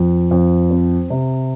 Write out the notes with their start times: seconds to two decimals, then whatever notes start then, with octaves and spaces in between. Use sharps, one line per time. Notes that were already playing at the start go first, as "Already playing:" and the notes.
Already playing: F2
0.31 F2
0.70 C4
1.10 C3